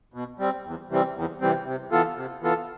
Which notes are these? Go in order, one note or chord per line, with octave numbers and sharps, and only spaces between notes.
B2
G3 C4
E2
C3 E3 G3 C4
E2
C3 E3 G3 C4
C3
E3 B3 F4 A4
C3
E3 B3 F4 A4